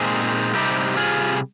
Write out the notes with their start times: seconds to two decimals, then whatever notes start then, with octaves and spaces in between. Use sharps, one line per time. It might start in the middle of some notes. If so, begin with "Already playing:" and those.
Already playing: A#2 G#3 C4 D#4 G#4 C5
0.54 C3 G3 C4 D#4 G4
0.97 F4 G#4